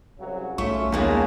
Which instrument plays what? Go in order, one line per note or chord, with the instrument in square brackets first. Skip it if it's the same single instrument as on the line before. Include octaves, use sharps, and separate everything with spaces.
[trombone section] C2 C#3 F#3
[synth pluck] B1 [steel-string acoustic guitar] A3 E5 [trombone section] C#4 F4 [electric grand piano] C#6
[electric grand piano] D#2 [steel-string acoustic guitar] G#3 A#3 B3